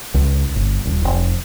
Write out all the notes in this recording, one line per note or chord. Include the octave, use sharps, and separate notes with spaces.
C#2
G1
D#1
F1